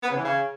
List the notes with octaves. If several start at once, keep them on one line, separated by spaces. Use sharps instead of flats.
B3
C#3
E3
C#3